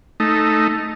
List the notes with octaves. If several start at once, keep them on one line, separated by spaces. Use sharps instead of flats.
A3 D#4